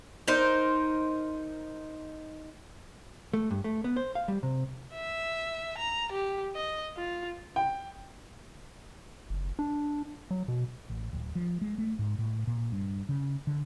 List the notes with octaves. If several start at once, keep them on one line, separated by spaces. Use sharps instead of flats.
D#4 A#4 C5
A3
G2
A3
B3
C5
F5
G3
C3
E5
A#5
G4
D#5
F4
G5
F#1
D4
F#3
B2
A1
D1
F3
G#3
A3
G#2
A2
A#2
G2
C#3
D3